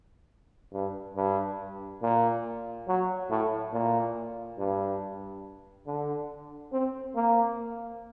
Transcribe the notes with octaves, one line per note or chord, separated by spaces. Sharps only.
G2
G2
A#2
F#3
A2
A#2
G2
D3
C4
A#3